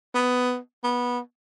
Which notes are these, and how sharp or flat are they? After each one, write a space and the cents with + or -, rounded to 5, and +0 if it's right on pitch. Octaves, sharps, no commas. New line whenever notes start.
B3 +10
B3 -15